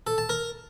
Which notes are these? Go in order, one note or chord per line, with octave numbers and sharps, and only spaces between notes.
A4
A5
A#4